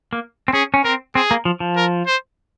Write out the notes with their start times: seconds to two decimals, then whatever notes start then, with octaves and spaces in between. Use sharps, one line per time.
0.13 A#3
0.48 C4
0.53 C#4 G#4
0.74 C#4
0.84 C4 A#4
1.15 C4 G#4
1.31 A#3
1.45 F3
1.60 F3
1.76 A#4
2.07 C5